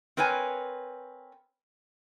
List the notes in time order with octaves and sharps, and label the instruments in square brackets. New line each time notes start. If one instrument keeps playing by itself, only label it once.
[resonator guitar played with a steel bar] C4 A#4 B4 C#5 G#5